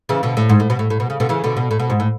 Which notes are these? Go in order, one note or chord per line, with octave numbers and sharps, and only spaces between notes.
C#3 E3
B2 D3
A2
G#2
A2
B2
A2
A2
B2
C#3
B2 D3
C#3 E3
B2 D3
B2
A2
B2
G#2
A2